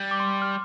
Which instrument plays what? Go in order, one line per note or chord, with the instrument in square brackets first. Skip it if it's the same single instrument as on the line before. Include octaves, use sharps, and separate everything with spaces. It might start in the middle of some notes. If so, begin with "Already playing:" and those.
Already playing: [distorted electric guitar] G3
[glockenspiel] D6
C6
F6